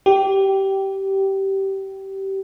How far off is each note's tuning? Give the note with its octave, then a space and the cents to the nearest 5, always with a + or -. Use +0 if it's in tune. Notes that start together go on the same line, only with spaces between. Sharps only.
G4 -20